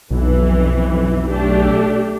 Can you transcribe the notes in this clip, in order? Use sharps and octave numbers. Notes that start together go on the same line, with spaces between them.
B1 F2 E3
A3 D4 G4